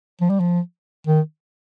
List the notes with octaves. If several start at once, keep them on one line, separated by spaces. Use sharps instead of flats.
F3
G3
F3
D#3